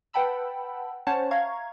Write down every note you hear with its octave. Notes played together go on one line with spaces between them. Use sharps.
B4 F#5 G5 A5 B5 E6
C#4 C5 C#5 F#5 A5
E5 F5 A#5 C#6 G#6